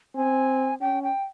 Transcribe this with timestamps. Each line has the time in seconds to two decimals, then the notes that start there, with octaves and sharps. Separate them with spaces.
0.16 C4 G#5
0.81 C#4 G5
1.03 G5